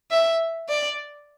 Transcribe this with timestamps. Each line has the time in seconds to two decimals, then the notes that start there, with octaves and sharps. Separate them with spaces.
0.11 E5
0.69 D5